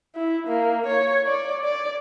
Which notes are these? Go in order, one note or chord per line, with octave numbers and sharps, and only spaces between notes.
E4
A#3
C#5
D5
D5